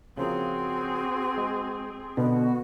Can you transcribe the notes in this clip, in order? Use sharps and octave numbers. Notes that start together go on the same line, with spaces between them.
C#3 F3 A#3 C4 F#4 G#4
G#3
B2 D3 F#4